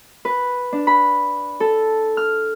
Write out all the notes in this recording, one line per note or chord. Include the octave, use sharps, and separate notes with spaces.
B4
D4
B5
A4
F6